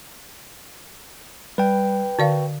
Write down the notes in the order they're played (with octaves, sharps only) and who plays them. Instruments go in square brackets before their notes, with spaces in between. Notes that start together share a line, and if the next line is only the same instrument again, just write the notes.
[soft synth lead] G3 [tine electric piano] B4 G5
[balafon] D3 D5 F5 [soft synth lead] F#4